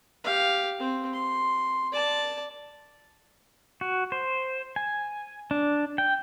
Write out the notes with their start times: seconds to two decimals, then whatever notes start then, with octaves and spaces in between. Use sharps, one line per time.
0.24 G4 F5
0.79 C4
1.13 C6
1.92 D5 A5
3.81 F#4
4.12 C5
4.76 G#5
5.51 D4
5.98 G5